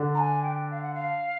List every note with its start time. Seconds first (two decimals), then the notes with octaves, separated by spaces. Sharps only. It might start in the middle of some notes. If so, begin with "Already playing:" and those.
Already playing: D3 D4
0.14 A#5
0.17 G#5
0.42 G5
0.70 F5
0.82 F#5
0.94 F5